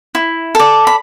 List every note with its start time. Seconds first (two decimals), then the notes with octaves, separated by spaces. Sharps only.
0.15 E4
0.55 A4 D5
0.87 B5